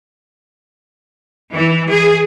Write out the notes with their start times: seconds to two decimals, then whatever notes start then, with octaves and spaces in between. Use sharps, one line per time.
1.53 E3
1.91 G#4